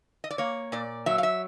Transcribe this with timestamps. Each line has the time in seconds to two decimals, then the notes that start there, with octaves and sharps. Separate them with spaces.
0.24 D#5
0.31 D5
0.38 A#3 C#5
0.72 A#2 D5
1.06 F#3 E5
1.18 F5
1.23 E5